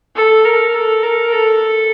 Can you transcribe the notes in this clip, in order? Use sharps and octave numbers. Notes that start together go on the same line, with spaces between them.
A4
A#4
A4
A#4
A4